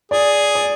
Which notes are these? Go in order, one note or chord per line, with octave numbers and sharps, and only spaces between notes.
G#4 D5
D5